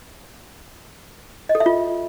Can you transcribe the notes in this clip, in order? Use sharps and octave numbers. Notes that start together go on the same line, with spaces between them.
D#5
A4
E5
F4